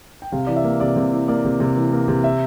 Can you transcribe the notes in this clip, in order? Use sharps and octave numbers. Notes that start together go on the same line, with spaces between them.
G5
C3 F5
E3 D5
E5
A#3
C3 D5
C3
E3
A#3 D5
C3
C3
E3
A#3
C3
E5